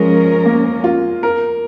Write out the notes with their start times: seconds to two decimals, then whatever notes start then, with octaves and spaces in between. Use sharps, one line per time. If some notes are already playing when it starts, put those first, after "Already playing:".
Already playing: F3 G#3 C#4 A#4
0.46 A#3
0.84 F4
1.23 A#4